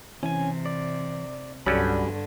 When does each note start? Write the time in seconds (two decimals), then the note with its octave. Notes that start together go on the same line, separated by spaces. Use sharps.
0.23 C3 E3 C#4 G#5
0.66 D5
1.66 C2 G2 D3 F#3 G3 C#4 B5